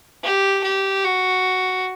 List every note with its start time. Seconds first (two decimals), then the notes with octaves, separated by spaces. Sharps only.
0.24 G4
0.64 G4
1.04 F#4